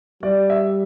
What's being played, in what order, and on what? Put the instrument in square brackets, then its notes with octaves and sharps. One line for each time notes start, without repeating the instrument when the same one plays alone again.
[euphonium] G3 [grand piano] D5
[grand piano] E5